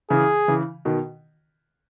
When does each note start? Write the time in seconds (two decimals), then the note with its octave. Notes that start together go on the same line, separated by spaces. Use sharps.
0.10 C#3 E3 G#4
0.48 C#3 E3
0.85 B2 D#3